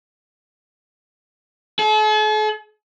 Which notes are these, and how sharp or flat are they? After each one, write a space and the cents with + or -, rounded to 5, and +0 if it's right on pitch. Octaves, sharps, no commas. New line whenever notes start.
A4 -45